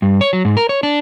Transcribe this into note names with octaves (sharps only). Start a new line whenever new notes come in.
G2
C#5
F#3
G#2
A#4
C#5
D4